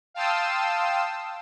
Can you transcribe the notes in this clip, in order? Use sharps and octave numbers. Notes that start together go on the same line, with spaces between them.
F5 G5 A5 C6 D#6 E6